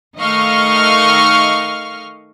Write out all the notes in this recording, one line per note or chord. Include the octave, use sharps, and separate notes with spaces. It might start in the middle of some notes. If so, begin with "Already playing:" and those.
D#3 A3 D#5 F5 C#6 F6